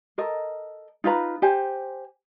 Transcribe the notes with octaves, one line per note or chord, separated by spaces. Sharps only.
A4 A#4 D#5
D#4 F4 B4 A#5
G4 C5 G#5